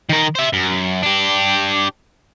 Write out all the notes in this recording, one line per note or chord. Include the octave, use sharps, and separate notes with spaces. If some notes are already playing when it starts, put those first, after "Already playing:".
D#3 A#4
C5 E5
F#2
D4 G4